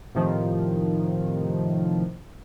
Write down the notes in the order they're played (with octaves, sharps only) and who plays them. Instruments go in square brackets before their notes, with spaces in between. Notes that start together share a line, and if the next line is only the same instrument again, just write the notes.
[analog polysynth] A2 C3 D#3 F3